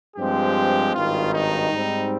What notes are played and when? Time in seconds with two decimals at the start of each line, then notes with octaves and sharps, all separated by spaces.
0.16 G2 F3 G#3 C4 G4
0.94 G#1 G2 D#3 F4
1.34 D#4
1.72 G#2 G3 C4